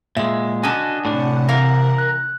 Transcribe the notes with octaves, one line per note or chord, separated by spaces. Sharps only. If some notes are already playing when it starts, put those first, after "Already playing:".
A#2 G#3 E5
D3 C#4 F#4 D#5 G#5 A5
A2 C3 D4 F#5
E3 A#4 F5
F#6